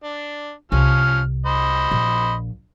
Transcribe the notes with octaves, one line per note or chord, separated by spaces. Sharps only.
D4
C2 F3 C#4 F6
C5 D#5 B5
A#1